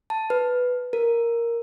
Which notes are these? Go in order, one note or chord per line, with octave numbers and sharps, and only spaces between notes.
A5
B4
A#4